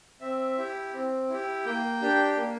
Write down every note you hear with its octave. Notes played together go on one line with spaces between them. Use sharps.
C4 E5
E4 G4
C4
E4 G4
A#3 G5
D4 G4
A#3